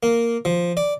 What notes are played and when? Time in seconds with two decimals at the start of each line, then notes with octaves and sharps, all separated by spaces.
0.03 A#3
0.45 F3
0.77 D5